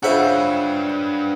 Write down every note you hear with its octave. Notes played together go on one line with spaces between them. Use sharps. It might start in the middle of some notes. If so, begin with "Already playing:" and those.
C#3 D4 F4 B4 C5 E5 F#5